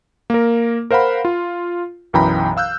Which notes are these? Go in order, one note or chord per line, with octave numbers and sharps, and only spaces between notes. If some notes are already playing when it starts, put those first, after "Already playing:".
A#3 A#4
A#4 C5 F5 F#5 B5
F4
B1 F#2 E3 G5 A#5 B5
F5 E6 F#6 G6